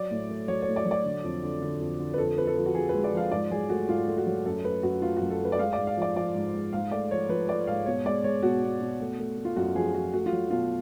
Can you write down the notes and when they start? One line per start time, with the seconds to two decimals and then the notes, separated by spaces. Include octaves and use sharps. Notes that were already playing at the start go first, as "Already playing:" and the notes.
Already playing: F#3 D5
0.11 A2
0.29 A3
0.48 F#3 C#5
0.62 C#5
0.67 A2
0.76 D5
0.85 F#3
0.91 D5
1.05 D3
1.24 F2
1.43 D3
1.62 D3
1.80 F2
1.99 D3
2.14 B4
2.18 F2 A4
2.38 F2 B4
2.47 A4
2.56 F3
2.66 F#4
2.75 F3 G#4
2.89 B4
2.94 G#3
3.04 D5
3.13 F3 F5
3.31 G#2 D5
3.51 F#3 G#4
3.69 A3 F#4
3.89 G#2 F4
4.08 A3
4.18 F#4
4.27 F#3
4.46 F#2 A4
4.64 A3 B4
4.83 F#2 F#4
5.02 A3 F4
5.17 F#2 F#4
5.30 A4
5.41 A3 B4
5.52 D5
5.59 G#3 F5
5.73 D5
5.78 G#2
5.87 F5
5.97 F3 D5
6.16 F3 D5
6.35 G#2
6.54 G#3
6.73 G#2 F5
6.91 A3 D5
7.11 F3 C#5
7.29 F3 B4
7.49 A3 D5
7.67 G#2 F5
7.86 B2 C#5
8.05 G#3 D5
8.24 G#3 C#5
8.43 B2 F#4
8.62 B2
8.81 B2
9.00 A3
9.19 A3
9.38 A3
9.45 F4
9.56 F#2 F#4
9.75 F3 G#4
9.94 F3 F#4
10.13 A3 F#4
10.26 F4
10.32 F#3
10.50 B2 F4